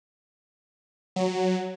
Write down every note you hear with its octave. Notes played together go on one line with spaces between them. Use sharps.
F#3